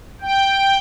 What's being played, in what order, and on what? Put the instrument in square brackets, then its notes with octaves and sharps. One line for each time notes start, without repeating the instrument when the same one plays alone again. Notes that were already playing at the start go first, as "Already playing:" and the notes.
[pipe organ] G5